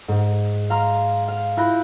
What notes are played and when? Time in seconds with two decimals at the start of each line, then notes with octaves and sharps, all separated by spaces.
0.08 G#2
0.70 F5 A#5 C6 F6
1.28 F5
1.57 E4 F4 B5 F#6 G6 A#6